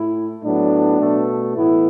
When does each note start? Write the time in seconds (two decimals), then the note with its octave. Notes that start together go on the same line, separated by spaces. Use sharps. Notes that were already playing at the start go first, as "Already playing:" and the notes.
Already playing: A2 A3 E4
0.43 A2 F#3 B3 D4
0.99 B2 A3
1.55 A2 E3 B3 E4